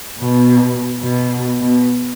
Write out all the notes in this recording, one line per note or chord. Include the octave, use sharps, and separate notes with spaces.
B2
B2
B2